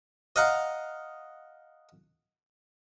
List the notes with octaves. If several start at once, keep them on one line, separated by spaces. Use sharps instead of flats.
D#5 F5 F#5 A#5